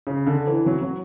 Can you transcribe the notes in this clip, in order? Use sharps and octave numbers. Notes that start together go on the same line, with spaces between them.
C#3
D3
E3
F#3
F#3